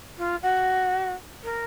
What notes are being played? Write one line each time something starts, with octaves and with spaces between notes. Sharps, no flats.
F4
F#4
A#4